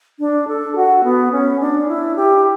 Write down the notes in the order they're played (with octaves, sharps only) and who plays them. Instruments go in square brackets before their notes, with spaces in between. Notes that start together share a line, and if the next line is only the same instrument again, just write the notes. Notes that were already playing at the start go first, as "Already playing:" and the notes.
[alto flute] D4
A4
F#4
B3
C#4
D4
E4
G4